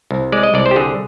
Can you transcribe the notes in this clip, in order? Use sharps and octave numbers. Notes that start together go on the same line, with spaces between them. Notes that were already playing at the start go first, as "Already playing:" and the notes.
C2
G#3 D5
D#5
C2 D5
C5
G4
D3 G#4